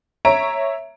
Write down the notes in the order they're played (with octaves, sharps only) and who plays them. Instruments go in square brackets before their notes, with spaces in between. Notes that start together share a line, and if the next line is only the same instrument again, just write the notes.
[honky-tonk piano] C#5 E5 A#5 D7